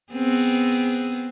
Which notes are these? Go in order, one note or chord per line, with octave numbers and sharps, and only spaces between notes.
B3 C4 G#4